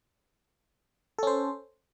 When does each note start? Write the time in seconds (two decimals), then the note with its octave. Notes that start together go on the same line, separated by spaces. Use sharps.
1.18 A4
1.23 C#4
1.27 C5